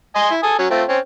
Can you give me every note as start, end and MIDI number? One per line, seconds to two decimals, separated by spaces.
0.16 0.31 75
0.16 0.31 80
0.16 0.31 84
0.31 0.38 64
0.43 0.56 69
0.43 0.56 80
0.43 0.56 87
0.59 0.67 54
0.59 0.67 61
0.70 0.83 57
0.70 0.83 60
0.70 0.83 65
0.89 0.98 60
0.89 0.98 61